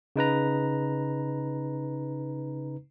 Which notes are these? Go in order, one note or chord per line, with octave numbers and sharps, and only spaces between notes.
C#3 D#4 B4 A#5